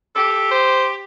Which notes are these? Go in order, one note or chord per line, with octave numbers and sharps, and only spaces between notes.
G4 A4
C5